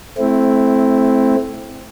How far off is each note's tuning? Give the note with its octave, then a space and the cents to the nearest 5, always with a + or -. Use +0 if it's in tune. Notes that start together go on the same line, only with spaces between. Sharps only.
A3 -20 C4 +0 E4 +0